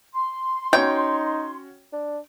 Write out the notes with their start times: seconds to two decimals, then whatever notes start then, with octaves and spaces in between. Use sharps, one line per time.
0.13 C6
0.73 C#4 D#4 F#4 C#5 G5
1.93 D4